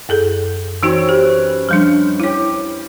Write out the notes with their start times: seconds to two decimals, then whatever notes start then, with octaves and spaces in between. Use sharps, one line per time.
0.09 F#2 G#4 A4
0.83 F#2 E3 C4 C#4 D#4 F#4
1.09 G4 B4
1.69 F3 G3 D4
2.20 E4 G4 C#5 F5